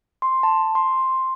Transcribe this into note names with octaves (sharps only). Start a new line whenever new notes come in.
C6
A5
C6